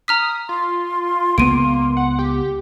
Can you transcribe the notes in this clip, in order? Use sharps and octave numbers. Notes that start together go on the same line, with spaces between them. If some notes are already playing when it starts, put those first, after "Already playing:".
A#5 D#6 F6 B6
F4 C6
C#2 G#3 A#3 B3 D7 D#7
F#5
G4